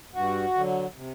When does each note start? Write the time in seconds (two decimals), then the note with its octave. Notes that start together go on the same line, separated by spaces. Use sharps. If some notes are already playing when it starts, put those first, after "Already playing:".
0.13 G2 F#4
0.54 D3 F#3
0.94 C3